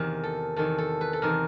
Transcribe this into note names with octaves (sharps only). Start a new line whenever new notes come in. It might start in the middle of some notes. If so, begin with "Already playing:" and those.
Already playing: E2 C3 D#3
A4
E2 C3 D#3 A4
A4
B4
A4
E2 C3 D#3 A#4